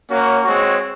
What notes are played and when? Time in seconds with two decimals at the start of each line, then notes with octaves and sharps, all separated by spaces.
0.09 A#3 C#4 F#4 C#5
0.44 G#3 C4 F#4 C#5